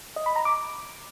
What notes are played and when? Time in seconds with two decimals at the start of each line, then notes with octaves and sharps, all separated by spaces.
0.16 D#5
0.26 B5
0.36 A#5
0.45 D6